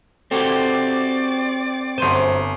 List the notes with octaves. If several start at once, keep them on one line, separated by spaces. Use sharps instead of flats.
C4 F#4 G4 A4 D5
G1 F#2 C5 D#7